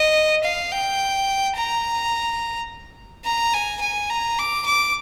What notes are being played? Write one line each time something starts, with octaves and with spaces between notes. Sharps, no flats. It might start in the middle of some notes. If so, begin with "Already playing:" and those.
Already playing: D#5
F5
G5
A#5
A#5
G#5
G#5
A#5
D6
D6